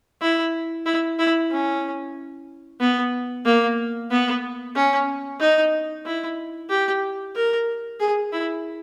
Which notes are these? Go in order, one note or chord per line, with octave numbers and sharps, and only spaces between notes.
E4
E4
E4
C#4
B3
A#3
B3
C#4
D#4
E4
G4
A#4
G#4
E4